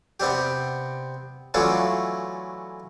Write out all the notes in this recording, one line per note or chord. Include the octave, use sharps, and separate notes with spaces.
C3 B3 C4 D4 G4
E3 F#3 A3 C#4 D4 F4